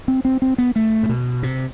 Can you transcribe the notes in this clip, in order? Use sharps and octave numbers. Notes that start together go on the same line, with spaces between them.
C4
C4
C4
B3
A3
A2
B2
C3